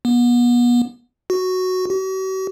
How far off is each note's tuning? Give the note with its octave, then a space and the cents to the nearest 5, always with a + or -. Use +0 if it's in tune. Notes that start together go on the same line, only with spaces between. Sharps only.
B3 -35
F#4 +0
F#4 +45